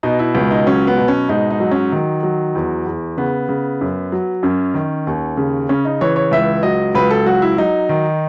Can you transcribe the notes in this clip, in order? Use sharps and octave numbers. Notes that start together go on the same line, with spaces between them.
B2 D#4
E4
C#2
D#4
F#3 C#4
B3
B2
C#4
G#2 D#4
D#4
F#3
C#4
D#3
F#3
E2
E2
C#3 B3
C#3
F#2
F#3
F#2 C#4
D#3
D#2
C#3
C#3 C#4
D#4
E3 C#5
C#5
C#2 E5
F#3 D#5
C#2 B4
A4
F#3 F#4
E4
F#3 D#4
D#3